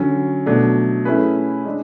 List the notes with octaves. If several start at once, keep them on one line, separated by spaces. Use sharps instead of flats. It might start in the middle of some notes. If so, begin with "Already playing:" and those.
Already playing: D3 F#3 C#4
B2 F#3 A3 D4
A3 C#4 E4 G#4 B4
G#3 D4